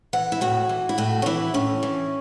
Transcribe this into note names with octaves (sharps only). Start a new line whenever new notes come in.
E3 F#5
E4
A2 F#4
E3
E4
A2 F#4
C#4
E3 E4
A2 C#4
E3